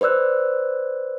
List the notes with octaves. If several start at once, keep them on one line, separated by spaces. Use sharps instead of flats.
B4 C5 D5 E6 F#6